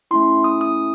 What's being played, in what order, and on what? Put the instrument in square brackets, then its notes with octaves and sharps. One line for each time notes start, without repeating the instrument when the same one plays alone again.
[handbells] A3 C#4 E4 C6
D#6
D#6